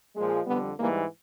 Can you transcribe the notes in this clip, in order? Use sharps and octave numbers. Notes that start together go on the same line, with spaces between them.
A#2 F3 G#3
F2 D3 G3 B3
G#2 E3 G3 A#3